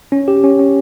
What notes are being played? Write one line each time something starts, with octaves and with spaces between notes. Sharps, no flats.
C#4
G4
C#4
C#4